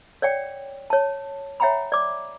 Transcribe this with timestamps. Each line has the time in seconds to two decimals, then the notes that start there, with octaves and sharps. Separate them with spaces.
0.22 C#5 D5 F#5 G5
0.90 C#5 A5
1.60 C#5 E5 F#5 G5 A#5 B5
1.92 D5 D6